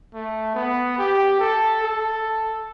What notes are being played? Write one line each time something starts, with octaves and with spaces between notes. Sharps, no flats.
A3
B3
G4
A4
A4